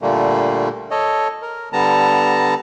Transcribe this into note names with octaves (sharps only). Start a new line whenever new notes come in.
A#2 D3 G3 A3 A#3
A4 C#5 D#5
A#4
D3 G3 B3 A5 A#5